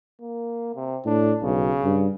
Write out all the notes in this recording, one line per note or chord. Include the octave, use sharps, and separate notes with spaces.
A#3
C3
A2 D4
B1 C#3
G2